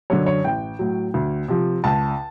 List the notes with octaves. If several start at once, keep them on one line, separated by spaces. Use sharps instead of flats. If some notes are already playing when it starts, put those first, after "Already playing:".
F#2 D3 C#5
C#5
A1 G5
A2 F#3
D2
C3 F3
C#2 A5